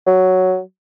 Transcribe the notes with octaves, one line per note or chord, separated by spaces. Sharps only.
F#3